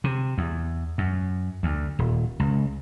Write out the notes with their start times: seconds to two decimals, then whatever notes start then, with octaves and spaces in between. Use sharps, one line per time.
0.04 C3
0.38 E2
0.98 F#2
1.63 D2
1.99 D#1
2.40 C#2